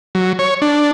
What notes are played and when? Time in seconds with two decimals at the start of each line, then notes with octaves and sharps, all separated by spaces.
0.15 F#3
0.39 C#5
0.62 D4